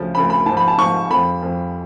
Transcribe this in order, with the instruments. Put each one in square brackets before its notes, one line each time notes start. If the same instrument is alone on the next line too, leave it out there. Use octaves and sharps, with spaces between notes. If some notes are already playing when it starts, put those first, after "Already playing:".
Already playing: [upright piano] D2 C#3 F3
D2 C#3 F3 B5
B5
G#2 A5
F3
B5
A5
G#2 F3 C#6
F2 F3 B5
F2 F3